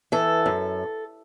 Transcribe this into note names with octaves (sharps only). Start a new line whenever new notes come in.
E3 A4
F#2